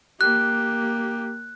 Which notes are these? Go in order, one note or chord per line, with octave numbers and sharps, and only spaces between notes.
A#3 G4 F#6